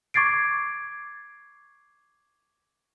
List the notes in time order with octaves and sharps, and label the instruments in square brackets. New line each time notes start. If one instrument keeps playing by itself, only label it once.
[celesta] C#6 D6 G#6 A6 C7 D7